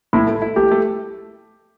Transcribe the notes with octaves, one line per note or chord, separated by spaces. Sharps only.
A2 E4
A3
A4
E4
A3 G4
A3